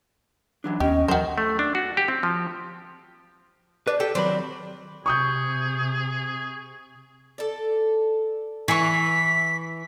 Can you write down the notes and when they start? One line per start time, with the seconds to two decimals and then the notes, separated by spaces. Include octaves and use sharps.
0.64 E3 F#3 D4
0.80 D#2 B3 C#4 G4 D#5
1.08 D#2 E3 F#3 F#4 A#4 C5 G5
1.38 A3
1.59 D4
1.75 F#4
1.97 G4
2.08 C4
2.23 F3
3.87 D4 B4
4.00 G4 A4 G5
4.15 D#3 F#3 C4 D4 B5
5.06 C3 G#4 C#6 D#6 G6
7.38 A4 D5
8.68 E3 G#5 C#6 B6